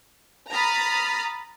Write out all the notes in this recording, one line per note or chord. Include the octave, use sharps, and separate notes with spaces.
A#5 B5 D#6 F6 A6